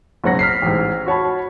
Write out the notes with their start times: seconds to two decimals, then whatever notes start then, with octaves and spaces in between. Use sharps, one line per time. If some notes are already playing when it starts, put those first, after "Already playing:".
0.24 F#1 G#2 C#4 F#5 A#6
0.39 F6 B6 C7
0.62 A1 G#2
1.06 F#4 C#5 A5 B5